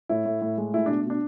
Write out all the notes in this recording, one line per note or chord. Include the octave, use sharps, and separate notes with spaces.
A2 E4
A2
A2
G#3
A3 E4
B2 D4
B2 D4